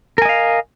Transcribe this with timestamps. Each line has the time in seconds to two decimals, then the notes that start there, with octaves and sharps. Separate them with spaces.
0.18 A#4
0.22 G#5
0.25 D#5
0.29 F5